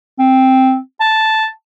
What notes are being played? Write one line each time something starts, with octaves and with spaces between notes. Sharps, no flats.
C4
A5